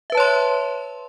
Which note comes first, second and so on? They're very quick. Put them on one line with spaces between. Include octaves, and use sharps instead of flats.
E5 B4 A5 C#5 C6